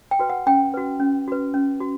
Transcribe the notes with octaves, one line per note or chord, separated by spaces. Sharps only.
G5
F#4 B4
F#5
C#4 G5
F#4 B4
C#4
F#4 B4
C#4
F#4